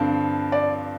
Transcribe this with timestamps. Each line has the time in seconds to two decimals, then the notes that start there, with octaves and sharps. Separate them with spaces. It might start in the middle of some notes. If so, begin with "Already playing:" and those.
Already playing: G2 D3 F3 C4
0.52 D5